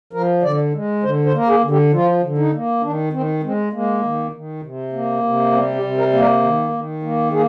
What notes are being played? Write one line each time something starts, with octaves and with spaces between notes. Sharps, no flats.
F3 A#4
D3 D5
G#3
D3 C5
C5
A#3 A#4
G#4
D3
G4
F3 F4
D3
D#4
A#3
D#3 D4
D#3 C4
G#3 C4
G#3 A#3
D#3
D#3
C3
A#3
C3
G3 C4
G4
C3
A#4
A#3
A#4
D#3
D#3
A#3
A#3 G#4